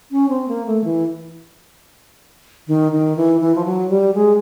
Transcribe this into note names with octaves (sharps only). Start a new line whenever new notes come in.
C#4
C4
A#3
A3
E3
D#3
D#3
E3
E3
F3
F#3
G3
G#3